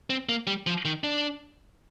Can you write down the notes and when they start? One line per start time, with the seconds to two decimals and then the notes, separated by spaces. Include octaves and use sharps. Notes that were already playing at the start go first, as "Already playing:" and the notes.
0.10 C4
0.29 A#3
0.47 G3
0.67 F3
0.85 D#3
1.04 D4